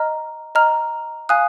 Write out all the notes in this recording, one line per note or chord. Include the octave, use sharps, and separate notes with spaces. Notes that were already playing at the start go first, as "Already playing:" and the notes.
Already playing: D#5 A#5 F6
D#5 A#5 F6
F5 G#5 D#6 F#6